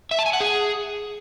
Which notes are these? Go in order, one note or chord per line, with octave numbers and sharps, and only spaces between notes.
E5
A5
G#5
F#5
G#4